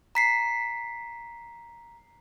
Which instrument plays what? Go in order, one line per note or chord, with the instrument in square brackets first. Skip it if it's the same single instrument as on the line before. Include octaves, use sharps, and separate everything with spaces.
[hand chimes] A#5 B6 C7